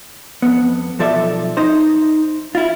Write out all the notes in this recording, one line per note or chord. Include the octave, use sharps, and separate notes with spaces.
F2 B3
B1 F3 A4 D5 E5
D#4 C5
E4 F4